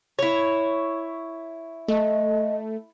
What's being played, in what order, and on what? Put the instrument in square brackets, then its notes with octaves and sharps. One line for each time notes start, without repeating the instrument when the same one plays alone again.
[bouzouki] E4 C#5
[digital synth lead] A3 [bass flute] D#5